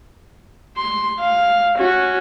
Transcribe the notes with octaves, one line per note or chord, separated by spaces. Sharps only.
C6
F5
C#4 F#4